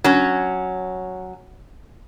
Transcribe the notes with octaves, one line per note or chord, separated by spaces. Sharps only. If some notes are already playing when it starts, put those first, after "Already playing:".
F#3 C#4